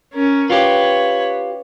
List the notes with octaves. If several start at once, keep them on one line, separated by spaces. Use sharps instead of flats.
C#4 A#4
F4 G4 B4 C#5